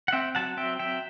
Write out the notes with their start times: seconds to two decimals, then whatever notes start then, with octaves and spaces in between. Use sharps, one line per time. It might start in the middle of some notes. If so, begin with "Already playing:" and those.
0.08 F#5
0.12 C4 E5 G5
0.35 F#3 F#5 A5
0.57 C4 E5 G5
0.79 F#3 E5 G5